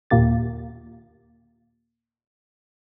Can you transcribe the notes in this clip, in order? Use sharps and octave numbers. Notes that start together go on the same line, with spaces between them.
D#2 A#2 A#3 G4 A6